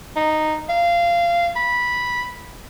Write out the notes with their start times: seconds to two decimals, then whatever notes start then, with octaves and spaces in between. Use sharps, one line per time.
0.16 D#4
0.69 F5
1.56 B5